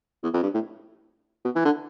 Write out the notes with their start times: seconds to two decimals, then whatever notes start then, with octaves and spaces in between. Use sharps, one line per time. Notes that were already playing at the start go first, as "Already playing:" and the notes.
0.23 E2
0.34 F2
0.43 G2
0.54 A2
1.45 B2
1.56 E3
1.65 D3